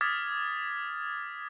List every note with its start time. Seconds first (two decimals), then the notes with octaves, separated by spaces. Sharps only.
0.01 D6 D#6 F6 G#6 A6 B6